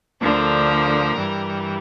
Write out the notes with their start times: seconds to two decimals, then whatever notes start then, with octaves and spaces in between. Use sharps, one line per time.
0.21 D2 D3 F3 A#4
1.16 G2 E3 G3